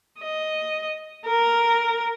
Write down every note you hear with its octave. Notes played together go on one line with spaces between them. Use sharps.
D#5
A#4